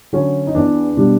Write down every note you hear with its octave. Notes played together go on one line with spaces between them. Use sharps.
D3 F#3 C#4
D#4
E2 D4
B2 G3 D4